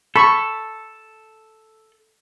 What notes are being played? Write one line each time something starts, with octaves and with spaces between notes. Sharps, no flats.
A4 B5 C#6